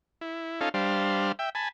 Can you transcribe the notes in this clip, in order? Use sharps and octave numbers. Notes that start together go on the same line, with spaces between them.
E4
C#4 D#4 F4 A4 F5
G3 D4 C5 F5
E5 G5
G#5 A5 B5